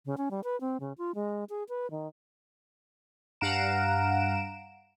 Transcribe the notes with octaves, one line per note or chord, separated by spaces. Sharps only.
C#3
C#4
G3
B4
C4
C#3
F4
G#3
G#4
B4
D#3
G2 F5 F#5 A#5 D7 E7